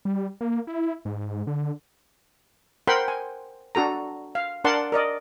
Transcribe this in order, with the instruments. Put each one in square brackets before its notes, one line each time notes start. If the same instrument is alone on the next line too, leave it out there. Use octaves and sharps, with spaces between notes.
[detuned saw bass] G3
A#3
E4
G#2
D3
[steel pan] A#4 C5 F#5 G5 B5 C6
G#5
D4 F#4 A4 A#5
F5
D4 A#4 D5 F#5 A5 C6
A#4 D5 D#5